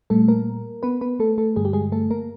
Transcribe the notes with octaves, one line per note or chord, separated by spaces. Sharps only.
A#2 G3 A3 A4
A#3 A#4
B3 B4
B3 B4
A3 A4
A3 A4
G2 D3 G3 G#4
G4
G#3 G#4
A3 A4
A#3 A#4